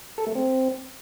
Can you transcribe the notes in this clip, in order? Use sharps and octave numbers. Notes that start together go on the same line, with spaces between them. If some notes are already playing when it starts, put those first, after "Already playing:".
A4
A3
C4